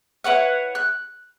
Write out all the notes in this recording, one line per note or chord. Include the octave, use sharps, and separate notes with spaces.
E4 B4 C#5 F#5
F#6